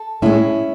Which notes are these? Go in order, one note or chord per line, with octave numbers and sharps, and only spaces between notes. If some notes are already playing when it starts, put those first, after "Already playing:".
Already playing: A4
A2 G#3 C#4 E4